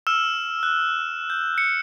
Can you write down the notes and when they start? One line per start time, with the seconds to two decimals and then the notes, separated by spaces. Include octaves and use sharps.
0.07 E6 F6 E7
0.63 F#6
1.30 G6
1.58 C#7